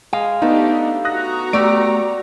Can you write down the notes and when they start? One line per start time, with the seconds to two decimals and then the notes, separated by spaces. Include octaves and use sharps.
0.13 G#3 F5
0.42 A3 B3 D4 D#4 G4
1.05 B3 F#4 A#5 D#6 F#6 A#6
1.53 A3 G4 D5 D7